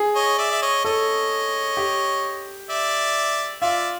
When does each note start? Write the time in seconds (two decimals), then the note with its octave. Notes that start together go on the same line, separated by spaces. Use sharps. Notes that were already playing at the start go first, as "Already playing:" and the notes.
Already playing: G#4
0.15 C#5 D#5
0.38 D5 E5
0.51 E5
0.62 C#5 D#5
0.85 A4 C#5 D#5
1.77 G4
2.70 D5 E5
3.62 F4 D5 E5